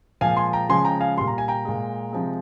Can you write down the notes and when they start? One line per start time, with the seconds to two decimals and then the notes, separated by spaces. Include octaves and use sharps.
0.21 A#2 F3 G#3 F5 G#5
0.37 G#5 C6
0.53 G5 A#5
0.69 C#3 F3 G#3 G#5 C6
0.85 G5 A#5
1.01 F5 G#5
1.17 A#2 G3 C6
1.27 A#5
1.38 G#5
1.48 G5 A#5
1.65 A#2 G#3
2.13 C3 F3 G#3